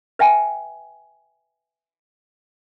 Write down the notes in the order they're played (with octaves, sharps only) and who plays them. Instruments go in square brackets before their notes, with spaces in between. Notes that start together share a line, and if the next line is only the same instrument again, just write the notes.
[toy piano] B4 E5 G5 G#5